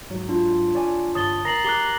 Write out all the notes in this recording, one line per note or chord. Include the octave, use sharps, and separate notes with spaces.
G#2 F#3
D4 F4
C#5 D5 G#5
G1 C#5 A5 D#6 A6 G7
A#4 A#5 A#6 C7 F#7
G4 A#5 D6 F#6 C7 G7